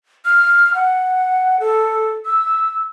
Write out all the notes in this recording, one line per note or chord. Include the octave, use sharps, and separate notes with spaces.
F6
F#5
A4
E6